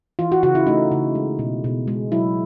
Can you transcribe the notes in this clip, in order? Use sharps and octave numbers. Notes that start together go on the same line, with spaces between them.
E3 F4
F#4
C#3 F#4
E4
A3 D#4
C#3
G#3
B2
B2
G#3
F#3 E4